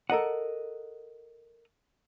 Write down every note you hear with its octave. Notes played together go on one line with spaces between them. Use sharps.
A4 A#4 D#5 F#5